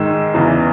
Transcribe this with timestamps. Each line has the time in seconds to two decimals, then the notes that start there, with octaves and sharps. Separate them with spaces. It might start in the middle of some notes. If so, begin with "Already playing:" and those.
Already playing: G#2 D#3 G#3 E6
0.34 E2 C#3 E3